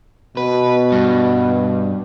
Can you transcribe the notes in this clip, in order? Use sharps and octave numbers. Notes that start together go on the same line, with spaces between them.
B2 B4
G2